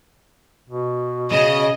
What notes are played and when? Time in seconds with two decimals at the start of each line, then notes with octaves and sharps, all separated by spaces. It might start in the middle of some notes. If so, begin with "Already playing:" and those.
0.69 B2
1.32 C#3 D#5